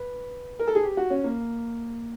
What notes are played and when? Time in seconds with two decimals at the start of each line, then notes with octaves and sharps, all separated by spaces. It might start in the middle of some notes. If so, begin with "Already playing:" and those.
Already playing: B4
0.59 A#4
0.67 A4
0.75 G#4
0.83 G4
0.97 F#4
1.10 C#4
1.24 A#3